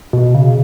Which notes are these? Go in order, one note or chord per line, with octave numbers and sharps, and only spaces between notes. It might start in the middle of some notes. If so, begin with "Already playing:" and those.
B2
C#3